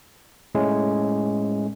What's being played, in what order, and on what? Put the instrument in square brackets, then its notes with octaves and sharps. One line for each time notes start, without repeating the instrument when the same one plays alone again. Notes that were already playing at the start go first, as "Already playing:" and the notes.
[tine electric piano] A2 G#3 A3 C#4